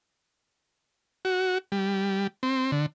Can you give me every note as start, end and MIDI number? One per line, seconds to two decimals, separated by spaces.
1.25 1.58 66
1.72 2.27 55
2.43 2.71 60
2.72 2.86 50